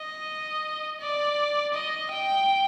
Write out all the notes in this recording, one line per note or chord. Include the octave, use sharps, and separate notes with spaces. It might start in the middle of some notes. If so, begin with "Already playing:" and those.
Already playing: D#5
D5
D#5
G5